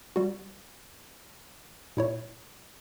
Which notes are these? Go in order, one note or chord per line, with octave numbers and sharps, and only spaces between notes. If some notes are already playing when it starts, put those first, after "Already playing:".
G3 F#4
A#2 E4 C#5